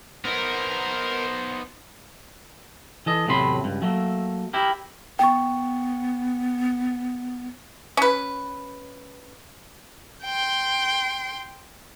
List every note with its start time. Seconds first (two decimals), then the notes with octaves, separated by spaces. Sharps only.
0.25 B3 D#4 A#4 C5
3.06 E3 A4 D#5
3.28 E2 A2 C3 F#3 B5 C6
3.64 C#2 G2
3.82 F#3 A3 A#3
4.53 E4 G4 A#4
5.19 B3 G5 C#6
7.97 C#4 B4
10.24 G5 C6